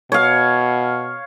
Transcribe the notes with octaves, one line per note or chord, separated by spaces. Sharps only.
B2 C#5 F5